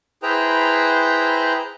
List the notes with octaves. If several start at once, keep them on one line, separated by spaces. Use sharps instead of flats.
E4 G#4 B4 C5 G5 A#5